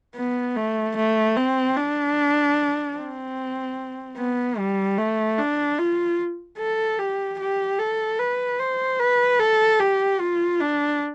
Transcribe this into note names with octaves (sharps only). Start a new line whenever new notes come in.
B3
A3
A3
C4
D4
C4
B3
G3
A3
D4
F4
A4
G4
G4
A4
B4
C5
B4
A4
G4
F4
D4